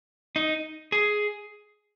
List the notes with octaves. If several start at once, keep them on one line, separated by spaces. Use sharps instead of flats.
D#4
G#4